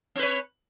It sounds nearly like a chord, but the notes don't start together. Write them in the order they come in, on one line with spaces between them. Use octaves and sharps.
C4 B4 C#5